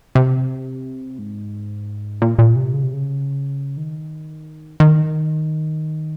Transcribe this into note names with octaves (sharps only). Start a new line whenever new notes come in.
C3
G#2
A#2
A#2
C3
C#3
C3
C#3
D#3
D#3